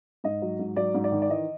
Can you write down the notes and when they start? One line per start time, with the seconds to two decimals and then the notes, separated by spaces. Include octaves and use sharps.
0.24 G#2 D#5
0.42 F#3
0.59 G#2
0.76 F#3 D5
0.94 G#2
1.04 D5
1.12 D#3
1.22 D5
1.30 E3 D#5